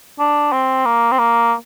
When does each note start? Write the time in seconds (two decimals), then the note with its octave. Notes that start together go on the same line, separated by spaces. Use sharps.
0.19 D4
0.52 C4
0.86 A#3
1.12 C4
1.19 A#3